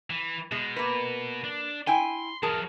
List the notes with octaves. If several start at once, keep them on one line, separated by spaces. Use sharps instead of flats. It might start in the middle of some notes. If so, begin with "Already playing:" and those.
E3
B2 G#3
A#3 B4
D4
E4 G5 G#5 C6
E3 F#3 G#4 A#4 A5